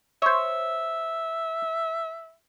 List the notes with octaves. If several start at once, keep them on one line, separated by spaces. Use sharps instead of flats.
C5 C#5 E5